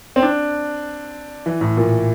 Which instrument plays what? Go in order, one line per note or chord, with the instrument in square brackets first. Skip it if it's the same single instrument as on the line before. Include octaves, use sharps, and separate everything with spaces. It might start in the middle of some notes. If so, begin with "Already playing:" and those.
[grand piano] C4
D4
E3
A2
A#2